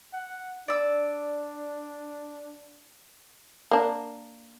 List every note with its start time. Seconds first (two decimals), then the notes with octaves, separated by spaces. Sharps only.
0.13 F#5
0.68 D4 D5 E6
3.71 A#3 D4